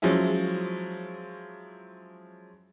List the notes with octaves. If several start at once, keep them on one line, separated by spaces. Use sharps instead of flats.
F3 F#3 G#3 C#4 E4